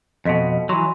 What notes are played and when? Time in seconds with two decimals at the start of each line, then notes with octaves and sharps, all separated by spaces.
0.25 F2 B2 A4 D#5 B6
0.69 E3 F#3 C6